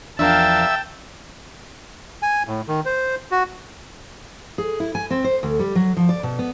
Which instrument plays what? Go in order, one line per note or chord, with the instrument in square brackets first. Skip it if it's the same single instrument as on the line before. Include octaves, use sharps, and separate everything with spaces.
[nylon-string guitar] E2 F3 D4 [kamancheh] A#4 F5 [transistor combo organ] E5 [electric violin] G5 A5
[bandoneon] G#5
A2
D#3
C5
F#4
[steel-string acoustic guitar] G#4
E4
G#5
C4
C5
D2
G3
F#3
F3
D5
B2
B3